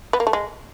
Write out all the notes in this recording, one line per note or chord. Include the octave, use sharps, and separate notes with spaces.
B3
A#3
A3
G#3